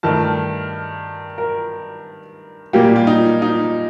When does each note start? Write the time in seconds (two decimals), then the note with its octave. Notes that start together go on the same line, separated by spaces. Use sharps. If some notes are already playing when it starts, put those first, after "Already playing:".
0.03 G2 D#3 A3 A5
1.38 A#4
2.73 A#2 G3 A#3 G4
2.96 F4
3.07 D#4
3.42 D#4